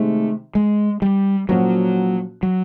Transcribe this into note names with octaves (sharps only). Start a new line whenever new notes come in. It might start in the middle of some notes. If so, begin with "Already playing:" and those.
Already playing: C3 D#3 G#3 A3
G#3
G3
A#2 F3 F#3 A#3 C#4 F#4
F#3